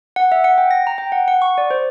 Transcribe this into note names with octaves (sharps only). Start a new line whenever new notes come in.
F#5
E5
F#5
G5
A#6
A#5
G5
F#5
F#5
C#6
D5
C5